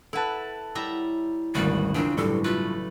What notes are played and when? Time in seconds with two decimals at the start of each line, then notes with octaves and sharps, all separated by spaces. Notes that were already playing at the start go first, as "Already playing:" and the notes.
0.13 E4 A4 B4 F#5 A5
0.75 G3 E4 C#5 E5 A#5
1.55 D#1 G#1 D2 C#3 G3 F#4 B4 G6
1.94 E2 C#3 C4 D4 F4
2.17 A1 G2 F#3 A4 D5
2.44 A3 F4 B4